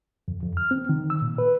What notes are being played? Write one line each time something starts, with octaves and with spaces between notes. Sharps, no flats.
F2
F2
F6
C4
D#3
E6
A#2
B4